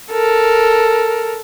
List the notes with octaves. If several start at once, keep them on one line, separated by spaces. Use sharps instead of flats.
A4 A#4